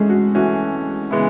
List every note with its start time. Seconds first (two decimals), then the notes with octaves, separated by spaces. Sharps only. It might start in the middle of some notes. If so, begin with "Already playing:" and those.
Already playing: E3 G#3 A3 C#4 G#4 A4
0.09 F#4
0.35 E3 A3 C#4 F#4
1.11 C#3 E3 G#3 B3 E4